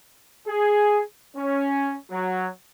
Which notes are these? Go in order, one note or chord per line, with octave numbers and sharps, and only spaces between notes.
G#4
C#4
F#3